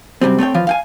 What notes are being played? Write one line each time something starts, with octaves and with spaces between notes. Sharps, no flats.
F#2 C3 G3 C4
A3 C4 C#5 G5
E3 F3 F5
F5 G5 G#5